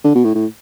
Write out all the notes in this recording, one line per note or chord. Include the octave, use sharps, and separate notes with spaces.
D3
B2
A2
A2